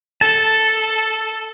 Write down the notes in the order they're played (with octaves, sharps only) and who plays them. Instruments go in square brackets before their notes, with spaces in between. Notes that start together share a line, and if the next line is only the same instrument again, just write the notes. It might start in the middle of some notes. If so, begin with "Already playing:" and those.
[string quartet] A4 [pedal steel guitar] A5